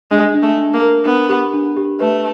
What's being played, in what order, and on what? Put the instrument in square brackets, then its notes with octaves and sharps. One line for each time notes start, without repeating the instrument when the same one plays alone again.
[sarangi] G#3 [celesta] D4
[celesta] D4
[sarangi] A3
[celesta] D4
[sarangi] A#3
[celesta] A#4
[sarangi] B3 [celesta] D4
[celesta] G4
D4
G4
[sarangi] A3 [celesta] B4